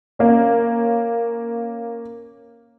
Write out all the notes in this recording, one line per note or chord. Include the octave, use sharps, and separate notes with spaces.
A#3 C#4